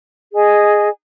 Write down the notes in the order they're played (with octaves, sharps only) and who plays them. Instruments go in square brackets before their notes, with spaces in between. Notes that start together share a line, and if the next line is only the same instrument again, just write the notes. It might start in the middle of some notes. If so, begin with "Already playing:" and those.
[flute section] G#4 D#5 G#5